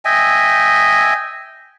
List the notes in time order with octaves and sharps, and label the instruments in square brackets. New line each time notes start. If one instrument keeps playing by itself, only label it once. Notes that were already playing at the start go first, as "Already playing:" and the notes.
[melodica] D#5 E5 G5 G#5